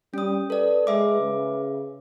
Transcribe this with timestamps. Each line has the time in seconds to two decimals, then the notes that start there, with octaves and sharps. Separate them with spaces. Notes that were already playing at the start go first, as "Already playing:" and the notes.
0.14 G3 C#4 D#6
0.50 A4 B4 D5
0.87 G#3 B4 E5 D6
1.21 C#3